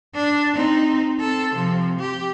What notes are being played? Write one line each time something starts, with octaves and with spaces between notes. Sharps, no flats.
D4
C4 D#4
C4 A4
C3 F3
G4